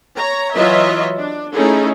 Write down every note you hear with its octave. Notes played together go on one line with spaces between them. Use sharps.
C#5 A#5
E3 F#3 F4 C#5 D#5 E5
D4
A3 C#4 D#4 E4 G#4 A4